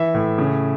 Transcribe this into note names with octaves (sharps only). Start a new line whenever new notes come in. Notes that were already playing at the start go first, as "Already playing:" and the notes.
Already playing: E3 E5
A2
C#3